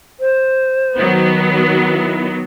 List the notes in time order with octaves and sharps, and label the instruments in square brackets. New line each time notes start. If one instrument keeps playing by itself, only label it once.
[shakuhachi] C5
[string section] D#3 F#3 B3
[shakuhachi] E4